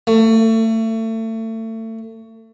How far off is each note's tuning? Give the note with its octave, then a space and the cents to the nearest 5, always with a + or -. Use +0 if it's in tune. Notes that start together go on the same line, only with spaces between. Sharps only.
A3 +30